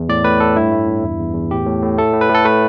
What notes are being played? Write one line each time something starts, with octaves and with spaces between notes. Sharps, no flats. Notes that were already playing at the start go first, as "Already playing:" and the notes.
Already playing: E2
A2 D5
A2 B4
A2 A4
G2 E4
A3
G2
E2
E2
E2
A2 G4
A2
A2
A3 A4
A2
B4
A2 A4
A3 B4